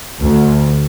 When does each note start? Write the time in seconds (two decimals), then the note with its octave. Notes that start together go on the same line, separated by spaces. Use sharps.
0.21 D2